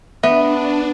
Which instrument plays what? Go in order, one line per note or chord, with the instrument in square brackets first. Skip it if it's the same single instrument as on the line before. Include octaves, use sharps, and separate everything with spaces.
[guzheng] B3 [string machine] D4 [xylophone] E5